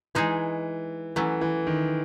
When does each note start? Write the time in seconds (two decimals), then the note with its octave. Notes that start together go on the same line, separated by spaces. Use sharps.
0.15 E3 G#3 D#4 G#4
1.16 E3 F#3 A3 C#4
1.41 E3
1.67 D#3